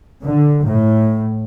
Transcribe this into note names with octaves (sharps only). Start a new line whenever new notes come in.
D3
A2